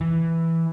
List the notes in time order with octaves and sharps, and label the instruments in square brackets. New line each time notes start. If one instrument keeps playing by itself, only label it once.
[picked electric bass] E3